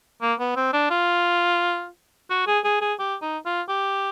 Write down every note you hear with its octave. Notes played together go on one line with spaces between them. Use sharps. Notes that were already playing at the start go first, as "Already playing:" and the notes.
A#3
B3
C4
D4
F4
F#4
G#4
G#4
G#4
G4
D#4
F4
G4